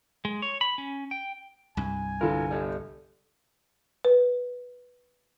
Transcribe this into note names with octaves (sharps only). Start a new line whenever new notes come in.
G#3
C#5
B5
C#4
G5
C2 G2 G#5
D3 E4 F4 A4 A#4
G3 A4
B4